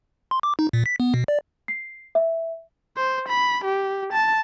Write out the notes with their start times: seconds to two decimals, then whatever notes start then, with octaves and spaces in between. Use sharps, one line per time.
0.31 C6
0.43 D6
0.59 D#4
0.73 A#2
0.86 B6
1.00 B3
1.14 B2
1.28 D5
1.68 C7
2.15 E5
2.97 C5
3.28 B5
3.64 G4
4.13 A5